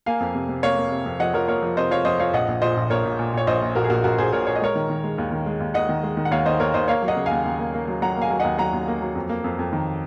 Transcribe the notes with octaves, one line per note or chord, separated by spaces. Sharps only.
A#3 F5 G#5
F2
C3
C3
A#3 C#5 F5
A#3
C3
F2
F3 D#5 F#5
F3 A#4 C#5
A#3 A#4 C#5
F3
C3 C5 D#5
F3 C#5 F5
F2 C5 D#5
F3 C#5 F5
A#1 D#5 F#5
A#1
A#2 C5 D#5
A#1
A#1 A#4 C#5
A#2
A#2
A#2 C#5
A#1 C5 D#5
A#2
A#1 F#4 A#4
G#4
A#1 F#4 A#4
A#1 F#4 A#4
A#1 G#4 C5
A#2 A#4 C#5
A#2 C#5
D#5
G#3 A#4 C#5
D#3
D#3
G#3
D#2
D#3
G#3
D#2
D#2 D#5 F#5
D#3
G#3
D#3
F#5
D#2 C#5 F5
D#3 C5 D#5
D#2 A#4 C#5
D#2 C5 D#5
A#3 C#5 F5
F#3
D#5 F#5
C#3
F5 G#5
D#2
D#2
A#3
A#3
F#3
F#3 F#5 A#5
A#3
F5 G#5
F#3
D#2 D#5 F#5
F#3 F#5 A#5
D#2
A#3
F#3
F2
A#3
F2
F2
D#3